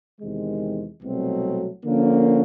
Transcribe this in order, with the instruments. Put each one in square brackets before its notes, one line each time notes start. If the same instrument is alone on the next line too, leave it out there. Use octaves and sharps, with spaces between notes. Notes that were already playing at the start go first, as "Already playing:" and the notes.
[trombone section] E2 C3 D#3 G#3
C2 B2 F#3 A3 C4
D3 F3 A#3 C#4